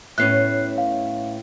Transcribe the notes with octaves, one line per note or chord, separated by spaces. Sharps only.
A2 B3 C#4 F#6 C7
F5